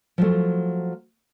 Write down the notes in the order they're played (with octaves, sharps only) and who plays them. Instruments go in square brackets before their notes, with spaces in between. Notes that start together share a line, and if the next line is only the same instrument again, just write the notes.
[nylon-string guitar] F3 F#3 A3